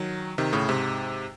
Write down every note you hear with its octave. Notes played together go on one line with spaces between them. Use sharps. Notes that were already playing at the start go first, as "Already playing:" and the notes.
Already playing: D#3 F#3
C3 D#3
A2 C#3
G#2 C3